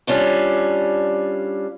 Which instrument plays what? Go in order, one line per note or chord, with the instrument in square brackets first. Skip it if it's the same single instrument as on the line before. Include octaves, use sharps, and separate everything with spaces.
[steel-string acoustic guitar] G3 C#4 D4 F4